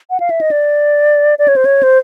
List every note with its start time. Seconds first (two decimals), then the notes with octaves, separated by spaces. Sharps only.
0.10 F#5
0.20 F5
0.30 E5
0.41 D#5
0.51 D5
1.39 D5
1.48 C#5
1.56 C5
1.65 C#5
1.83 C5